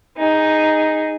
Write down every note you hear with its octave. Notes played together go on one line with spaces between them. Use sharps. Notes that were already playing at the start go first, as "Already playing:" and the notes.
D#4 G#4